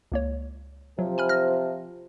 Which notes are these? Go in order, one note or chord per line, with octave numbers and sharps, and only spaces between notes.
C#2 A#3 C#5
C3 F3 F#3
G#5 B5 F6
F6 A#6